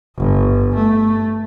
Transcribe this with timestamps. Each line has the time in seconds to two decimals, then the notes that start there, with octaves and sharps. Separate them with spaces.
0.18 G1
0.75 A3